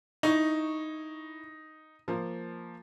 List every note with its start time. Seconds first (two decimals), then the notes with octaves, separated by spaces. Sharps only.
0.23 D#4 E4 C#6
2.08 F3 A#3